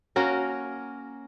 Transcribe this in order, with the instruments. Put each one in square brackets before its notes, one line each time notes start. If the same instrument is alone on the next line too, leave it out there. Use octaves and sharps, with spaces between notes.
[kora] A#3 C#4 F#4 A#4